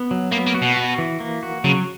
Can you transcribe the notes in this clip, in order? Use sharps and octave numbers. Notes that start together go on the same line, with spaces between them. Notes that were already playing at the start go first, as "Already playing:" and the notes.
Already playing: B3
F#3
A#3 B3
A#3
F#4
B2
F#4
E3
A#3
F#4
C#3 F#3